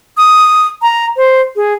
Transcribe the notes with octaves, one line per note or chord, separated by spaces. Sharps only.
D#6
A#5
C5
G#4